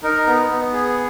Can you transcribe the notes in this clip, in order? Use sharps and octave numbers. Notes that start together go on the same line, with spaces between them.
D#4 A#4
B3
B3
G#4